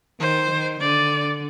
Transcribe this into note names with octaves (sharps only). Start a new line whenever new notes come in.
D#3 C5
D#3
D3 D5